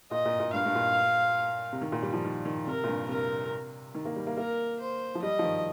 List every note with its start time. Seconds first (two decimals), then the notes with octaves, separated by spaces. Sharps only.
0.11 A#2 D#5
0.25 A#2
0.40 A#2
0.53 G2 F5
0.66 G2
0.75 A#2
1.73 C3
1.82 D#3
1.92 A#2
2.02 G3
2.13 F3
2.24 D#3
2.46 D#3
2.67 C3 A#4
2.84 A#2
2.88 G2
3.09 C3 A#4
3.95 D#3
4.05 A#3
4.16 G3
4.27 A#3
4.38 A#3 A#4
4.80 C5
5.15 F3
5.22 G3 D#5
5.39 F3
5.44 D#3